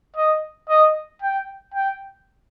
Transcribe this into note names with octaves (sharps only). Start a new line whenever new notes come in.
D#5
D#5
G5
G5